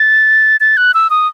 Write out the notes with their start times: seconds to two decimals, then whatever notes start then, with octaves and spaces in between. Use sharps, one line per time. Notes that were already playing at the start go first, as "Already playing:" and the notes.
Already playing: A6
0.60 A6
0.77 F#6
0.94 E6
1.10 D#6